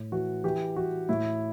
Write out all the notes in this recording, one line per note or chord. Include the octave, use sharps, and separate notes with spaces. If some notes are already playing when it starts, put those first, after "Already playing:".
Already playing: A2
E3 F#4
E3 G4
E3 F#4
A2 E4